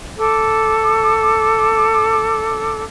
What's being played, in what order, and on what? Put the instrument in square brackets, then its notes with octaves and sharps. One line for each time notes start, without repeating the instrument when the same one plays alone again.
[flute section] A4 D6